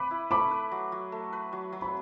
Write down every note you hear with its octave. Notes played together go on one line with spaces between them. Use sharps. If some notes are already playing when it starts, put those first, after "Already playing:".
Already playing: B4 B5 D6
E4
A3 B5 D6
B4
F#3
F#3
A3
B4
F#3
F#3
B5